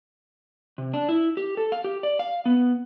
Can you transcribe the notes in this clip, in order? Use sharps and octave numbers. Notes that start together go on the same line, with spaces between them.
C3
D4
E4
G4
A4
F5
G4
D5
F5
B3